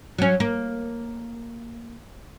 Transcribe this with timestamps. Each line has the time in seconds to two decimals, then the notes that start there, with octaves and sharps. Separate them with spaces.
0.18 F#3 C#4
0.40 A#3